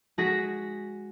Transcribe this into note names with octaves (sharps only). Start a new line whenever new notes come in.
G#3 F#4 G#4 A#6 B6